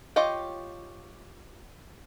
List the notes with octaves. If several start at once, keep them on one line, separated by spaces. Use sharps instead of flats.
F4 G4 C#5 D#5 G5